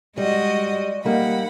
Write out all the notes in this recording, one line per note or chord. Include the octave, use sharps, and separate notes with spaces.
G3 G#3 F#4 D#5
G3 A#3 D#4 F#5 B5